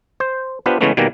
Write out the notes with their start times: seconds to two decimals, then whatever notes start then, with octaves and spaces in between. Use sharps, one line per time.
0.20 C5
0.66 B3 D4 F4 G4 B4 C5
0.81 C#3 E3 G#3 A3 B3 C#4
0.97 B2 D#3 G3 A#3 G#5